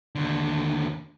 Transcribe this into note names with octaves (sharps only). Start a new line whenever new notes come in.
D#2 D3